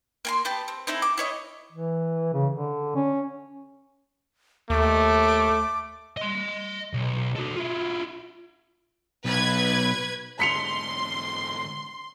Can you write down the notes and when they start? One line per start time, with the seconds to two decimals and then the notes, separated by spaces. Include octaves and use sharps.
0.25 A#3 G#5 C6
0.45 B3 G4 A5
0.68 C4
0.87 C4 D#4 E4 A4
1.02 D6
1.18 E4 C#5 D#5
1.72 E3
2.34 C#3
2.53 D3
2.95 C#4
4.70 D#2 A3 D6
6.17 D#5 C6
6.94 B1
7.35 F#4 A4
7.55 E4 F4
9.25 B1 B4 G#6
10.40 G#2 D3 C6 B6 C#7 F7